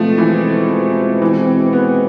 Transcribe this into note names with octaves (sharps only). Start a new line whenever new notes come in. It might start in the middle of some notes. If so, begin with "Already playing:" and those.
Already playing: B2 F3 G#3 A3 C4
E3
E3
B3